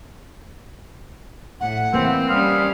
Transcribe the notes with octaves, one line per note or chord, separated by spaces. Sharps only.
A2 F#5
E3 A#3 C4 B4
G3 C#4 F5 D#6